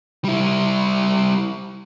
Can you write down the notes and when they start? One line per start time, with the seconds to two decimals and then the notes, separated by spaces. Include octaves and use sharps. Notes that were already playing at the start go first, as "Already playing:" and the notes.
0.24 G3 E4